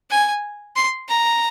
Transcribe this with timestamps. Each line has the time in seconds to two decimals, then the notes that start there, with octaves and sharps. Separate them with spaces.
0.10 G#5
0.76 C6
1.09 A#5